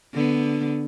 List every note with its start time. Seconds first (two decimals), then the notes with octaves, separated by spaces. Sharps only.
0.14 D3 B3